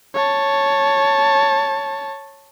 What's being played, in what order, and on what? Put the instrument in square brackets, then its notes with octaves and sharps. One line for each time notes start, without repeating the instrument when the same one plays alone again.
[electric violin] C#5 A5